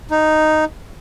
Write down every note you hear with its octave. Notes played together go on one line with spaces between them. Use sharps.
D#4